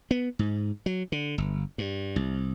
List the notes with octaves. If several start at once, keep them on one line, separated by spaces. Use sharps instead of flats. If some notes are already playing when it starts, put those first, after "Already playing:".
B3
G#2
F#3
D3
G1
G2
C2